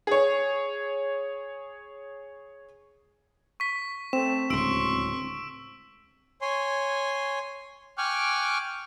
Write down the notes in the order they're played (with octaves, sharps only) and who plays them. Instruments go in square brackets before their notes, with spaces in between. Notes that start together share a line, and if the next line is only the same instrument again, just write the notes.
[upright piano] G#4 C#5
[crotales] C#6 B6
[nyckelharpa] A3 [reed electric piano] C4 [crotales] E7
[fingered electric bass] D1 C#2 [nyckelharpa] C6 C#6 [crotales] E6 D7
[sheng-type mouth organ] C#5 G#5 C6
G5 G#5 C#6 D6 F6 F#6